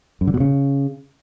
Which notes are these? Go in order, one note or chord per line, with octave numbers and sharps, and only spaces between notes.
F#2
D3
B2
C#3